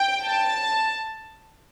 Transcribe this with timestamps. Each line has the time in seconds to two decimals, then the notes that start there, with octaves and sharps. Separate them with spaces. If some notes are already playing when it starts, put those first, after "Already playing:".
Already playing: G5
0.25 A5